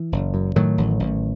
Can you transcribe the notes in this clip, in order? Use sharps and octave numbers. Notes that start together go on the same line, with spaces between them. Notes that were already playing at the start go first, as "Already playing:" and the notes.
Already playing: E3
F#1
F#2
A2 D#3 F#3
A1
A1